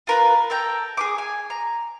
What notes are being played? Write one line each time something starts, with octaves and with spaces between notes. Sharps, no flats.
F4 A#4 B4
A4 A#4 G5 A#5
G#4 B4 D6
G#5
A#5